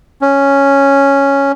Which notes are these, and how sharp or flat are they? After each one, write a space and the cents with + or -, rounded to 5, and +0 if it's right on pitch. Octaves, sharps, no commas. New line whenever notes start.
C#4 +0